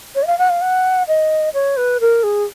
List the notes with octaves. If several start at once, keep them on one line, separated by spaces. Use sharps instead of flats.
C#5
D#5
F5
F#5
F5
F#5
D#5
C#5
B4
A#4
G#4